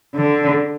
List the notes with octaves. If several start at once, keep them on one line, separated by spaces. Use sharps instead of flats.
D3